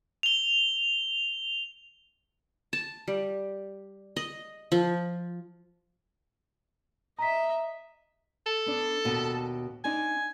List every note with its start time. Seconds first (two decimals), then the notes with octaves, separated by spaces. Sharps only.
0.23 F7 G7
2.73 A5
3.08 G3
4.16 D#5
4.72 F3
7.19 D#5 E5 A#5 B6
8.47 A4
8.66 B3 D4
9.05 D#2 B2
9.84 C4 D4 D#4 G#5